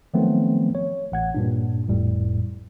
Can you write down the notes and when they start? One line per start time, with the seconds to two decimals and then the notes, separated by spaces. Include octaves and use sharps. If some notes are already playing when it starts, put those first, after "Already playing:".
0.14 D#3 F3 F#3 A3 B3 C4
0.75 C#5
1.12 A1 F#5 G#6
1.34 G2 A#2 D4
1.88 G1 F2 A2 G3